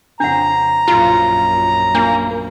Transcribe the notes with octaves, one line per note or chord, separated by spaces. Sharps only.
F2 C#3 D4 F#5 A#5
A#1 F#2 E4 F4
A#3 D4 F4